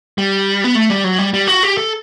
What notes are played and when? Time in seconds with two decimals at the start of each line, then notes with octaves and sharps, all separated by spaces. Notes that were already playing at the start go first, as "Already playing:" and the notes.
0.18 G3
0.64 B3
0.75 A3
0.90 G3
1.04 F#3
1.19 G3
1.34 G3
1.48 F#4
1.63 G4
1.78 A4